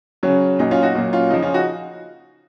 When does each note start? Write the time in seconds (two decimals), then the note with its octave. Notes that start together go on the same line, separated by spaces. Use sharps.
0.23 C#3 F#3 C#4
0.59 A#2 F#3 D#4
0.71 C#4 F4
0.82 D#4 F#4
0.95 A#2 F#3
1.13 C#4 F4
1.30 C#3 F3 D#4
1.42 C#4 F4
1.54 D#4 F#4